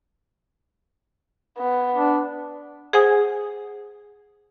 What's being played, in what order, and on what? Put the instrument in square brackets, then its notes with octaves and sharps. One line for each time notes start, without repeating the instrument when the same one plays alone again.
[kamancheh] B3
[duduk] D4
[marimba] G#4 C5 F#5 G#5 D#6